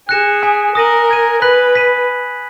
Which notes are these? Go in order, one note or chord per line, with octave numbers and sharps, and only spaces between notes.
G#4 F#6 A#6 C#7 E7
G#5 D#6 F#6 B6
A#4 D#6 A#6 D#7 F#7
D#6 G#6 D#7
B4 B5 F#6 B6 F#7
F#6 B6 D#7